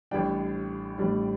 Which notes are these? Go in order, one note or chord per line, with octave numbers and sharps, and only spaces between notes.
A1 A2 G3 D4 G5
A1 A2 G3 D4